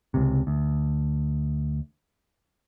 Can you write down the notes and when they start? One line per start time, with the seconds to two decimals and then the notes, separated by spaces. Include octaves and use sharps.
0.14 C#2 C3
0.47 D2